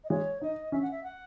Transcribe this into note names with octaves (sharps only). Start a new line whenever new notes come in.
D#5
G#3 C#5
D#4 D#5
C#4 E5
F#5
E5
F#5